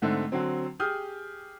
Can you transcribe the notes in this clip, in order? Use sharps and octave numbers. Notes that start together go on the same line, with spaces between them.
G#2 D3 A3 C4
D3 F#3 C4
G4 G#4 D#6 F6 G6